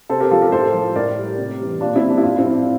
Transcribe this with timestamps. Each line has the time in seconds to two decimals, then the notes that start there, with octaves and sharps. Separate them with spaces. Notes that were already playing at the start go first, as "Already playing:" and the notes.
0.09 C3 A4 C5
0.20 G4 A#4
0.31 F3 F4 A4
0.42 G4 A#4
0.52 A2 A4 C5
0.74 F3
0.95 A2 A#4 D5
1.17 G3
1.38 C3
1.60 E3 G3
1.81 A#2 D4 F4
1.95 C4 E4
2.03 G3
2.10 D4
2.18 E4
2.23 A2 D4 F4
2.38 C4 E4
2.45 F3
2.52 D4